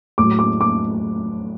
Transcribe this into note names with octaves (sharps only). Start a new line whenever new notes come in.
A2 F#3 D6
D6
D6